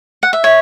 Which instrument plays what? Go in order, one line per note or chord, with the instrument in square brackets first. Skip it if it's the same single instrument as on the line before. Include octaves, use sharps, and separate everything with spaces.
[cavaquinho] F#5
E5
[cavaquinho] C#5 [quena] E5